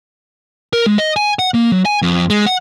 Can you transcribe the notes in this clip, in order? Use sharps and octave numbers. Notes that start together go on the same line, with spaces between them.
A#4
G#3
D#5
G#5
F#5
A#3
F#3
G#5
F2
G#3
F#5